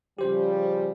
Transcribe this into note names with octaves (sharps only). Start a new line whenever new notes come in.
C#3 F3 G3 G4 C5